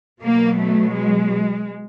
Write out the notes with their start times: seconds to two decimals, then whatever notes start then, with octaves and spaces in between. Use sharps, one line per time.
0.22 B2 F#3 A#3
0.58 A3
0.93 G#3